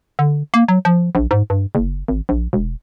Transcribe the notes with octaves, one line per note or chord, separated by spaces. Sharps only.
D3
A#3
F#3
F3
A#1
G#2
G2
F#1
G#1
A#1
E1